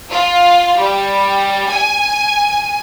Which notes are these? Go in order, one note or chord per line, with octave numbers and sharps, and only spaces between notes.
F4
G3
G#5